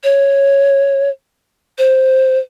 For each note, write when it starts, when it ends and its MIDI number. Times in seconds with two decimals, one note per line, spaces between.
0.04 1.09 73
1.78 2.39 72